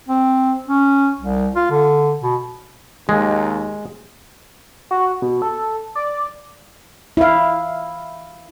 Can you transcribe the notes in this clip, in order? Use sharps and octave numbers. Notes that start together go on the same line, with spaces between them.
C4
C#4
C2
F4
D3
B2
D#2 G#3
F#4
B2
A4
D5
E4 F5